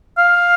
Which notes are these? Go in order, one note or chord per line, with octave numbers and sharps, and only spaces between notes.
F5